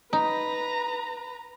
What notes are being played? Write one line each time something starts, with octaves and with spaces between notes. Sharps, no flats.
D#4 B4 A#5